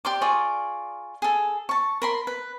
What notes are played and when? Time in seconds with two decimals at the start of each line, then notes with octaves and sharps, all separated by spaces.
0.05 G4 D5 C6 D6
0.21 F4 G#4 D5 C#6
1.22 G#4 A4
1.69 A5 C#6
2.02 A#4 B5 C6
2.27 B4